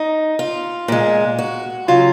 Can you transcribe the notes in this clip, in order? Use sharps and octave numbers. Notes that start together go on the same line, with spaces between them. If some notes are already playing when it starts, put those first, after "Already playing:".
Already playing: D#4
F4
A#2 G#3
F#4
C#3 F#3 F4